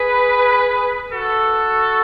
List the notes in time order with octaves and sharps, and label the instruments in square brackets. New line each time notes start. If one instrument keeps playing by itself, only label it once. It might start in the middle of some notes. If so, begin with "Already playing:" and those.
Already playing: [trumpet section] G#4 B4
F#4 A4